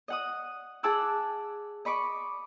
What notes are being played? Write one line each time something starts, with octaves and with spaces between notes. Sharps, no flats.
D#5 F#5 D#6
G#4 F#5 A5 D6 E6 F#6
D#5 B5 C#6 D6